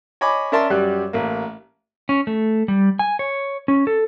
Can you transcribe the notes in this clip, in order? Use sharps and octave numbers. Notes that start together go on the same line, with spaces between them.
C#5 D#5 G#5 B5 D6
C#4 A#4 D5 E5 A5 C6
F#2 G3 G4 D5 F#6
A1 A#3
C#4
A3
G3
G#5
C#5
C#4
A4